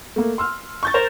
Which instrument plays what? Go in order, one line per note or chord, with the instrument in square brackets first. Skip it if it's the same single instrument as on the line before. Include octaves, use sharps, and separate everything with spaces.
[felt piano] A3 A#3
C6 E6 F6
[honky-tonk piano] C#6 G6 A6
[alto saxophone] A#4 [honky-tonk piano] C5